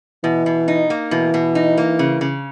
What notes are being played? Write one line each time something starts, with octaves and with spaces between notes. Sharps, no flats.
B2 E3
B2
D#4
A#3
B2 E3
B2
D#4
A#3
C#3
C#3